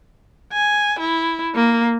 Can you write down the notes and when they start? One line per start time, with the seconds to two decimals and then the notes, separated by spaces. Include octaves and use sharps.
0.53 G#5
0.99 E4
1.55 A#3